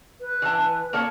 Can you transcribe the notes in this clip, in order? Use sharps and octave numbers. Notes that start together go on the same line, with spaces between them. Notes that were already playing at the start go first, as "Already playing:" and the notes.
B4
E3 A5
A#3 A4 C#5